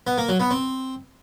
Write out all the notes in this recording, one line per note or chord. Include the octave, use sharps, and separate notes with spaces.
B3
A#3
F#3
B3
C4